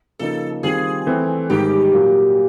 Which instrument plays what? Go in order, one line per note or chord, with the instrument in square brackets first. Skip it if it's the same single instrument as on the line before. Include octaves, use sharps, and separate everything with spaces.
[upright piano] C#3 F3 A#3 D#4 [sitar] A4
[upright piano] D#3 G3 C4 F4 [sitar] G#4
[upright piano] E3 A3 C4
[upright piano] G#2 D#3 G3 [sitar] G4
[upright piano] A#2 F#3 A#3